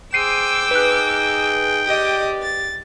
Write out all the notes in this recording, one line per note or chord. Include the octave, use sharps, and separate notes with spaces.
G#4 C5 G5 D6 E6 C7 D#7
D#4 G#4 B4 F#6
G4 D5 D#5 D6
A6